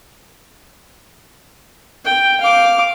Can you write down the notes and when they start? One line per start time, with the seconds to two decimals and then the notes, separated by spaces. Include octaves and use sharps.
2.05 G5
2.41 F5 D6